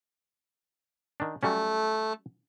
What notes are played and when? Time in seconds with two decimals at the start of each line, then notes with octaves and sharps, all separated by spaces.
1.20 D#3 D4
1.43 F#3 G3 A3 C#4